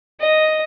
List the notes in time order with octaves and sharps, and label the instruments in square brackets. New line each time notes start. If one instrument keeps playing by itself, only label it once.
[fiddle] D#5